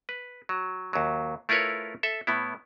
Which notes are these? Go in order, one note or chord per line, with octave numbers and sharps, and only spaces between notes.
B4
F#3
D#2 F#3
A3 E4 F4 A#4 B4 C#5
A4 E5
A2 B3 E4